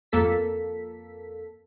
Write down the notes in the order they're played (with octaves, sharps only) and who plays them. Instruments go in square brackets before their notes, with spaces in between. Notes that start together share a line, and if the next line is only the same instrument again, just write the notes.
[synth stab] F2 A#3 A4 B6